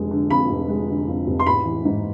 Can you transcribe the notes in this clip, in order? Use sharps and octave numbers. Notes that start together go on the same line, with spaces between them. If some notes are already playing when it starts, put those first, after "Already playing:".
Already playing: F1 F2 D3 G#3
D3
F2 B5
F1
G#3
D3
F2
F1
C6
A1 B5
E3
G#2